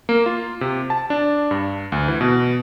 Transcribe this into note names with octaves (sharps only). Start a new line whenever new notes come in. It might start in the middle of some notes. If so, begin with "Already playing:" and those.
A#3
F4
C3
A5
D4
G2
D2
E3
B2